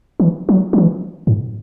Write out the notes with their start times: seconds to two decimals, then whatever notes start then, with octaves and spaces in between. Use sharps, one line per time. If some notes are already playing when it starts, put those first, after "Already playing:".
0.20 E3
0.49 F#3
0.73 F#3
0.78 E3
1.27 G#2